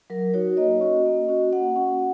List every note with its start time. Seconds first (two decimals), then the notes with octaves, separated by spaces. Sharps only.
0.10 F#3 A#4
0.34 D#4 F#4 C#5
0.57 A#3 D#5
0.81 C#4 F#4
1.05 A#3
1.29 C#4 F#4
1.52 A#3 F#5
1.76 C#4 F#4